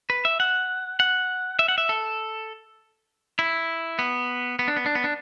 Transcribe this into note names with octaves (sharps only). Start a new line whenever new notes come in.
B4
E5
F#5
F#5
E5
F#5
E5
A4
E4
B3
B3
D4
B3
D4
B3
D4